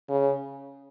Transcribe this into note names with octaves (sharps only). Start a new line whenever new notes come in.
C#3